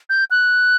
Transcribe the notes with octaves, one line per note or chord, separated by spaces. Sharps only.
G6
F#6